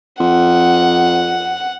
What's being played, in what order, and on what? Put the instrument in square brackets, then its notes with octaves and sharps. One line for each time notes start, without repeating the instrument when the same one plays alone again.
[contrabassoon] F2 [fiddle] F#5